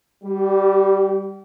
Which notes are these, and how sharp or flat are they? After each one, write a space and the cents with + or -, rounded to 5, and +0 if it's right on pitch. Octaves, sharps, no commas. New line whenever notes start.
G3 +0 G4 -40